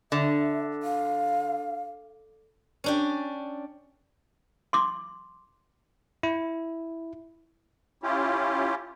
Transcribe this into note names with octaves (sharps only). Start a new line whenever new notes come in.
D3 E5
F5
C#4 D4 G4
C6 D6
E4
C#4 E4 F4 G4